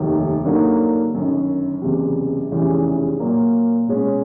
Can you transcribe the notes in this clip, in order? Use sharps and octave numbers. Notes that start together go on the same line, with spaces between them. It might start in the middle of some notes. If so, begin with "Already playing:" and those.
Already playing: F1 D#2 D#3 F#3
G2 D3 F#3 A#3 D#4
G1 F#2 D#3
F#1 E2 C3
F1 E2 C#3 E3 G3
A#2 F#3 A#3
B2 G#3 C#4